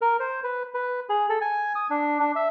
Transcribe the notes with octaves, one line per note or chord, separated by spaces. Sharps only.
A#4
C5
B4
B4
G#4
A4
G#5
D#6
D4
D4
E5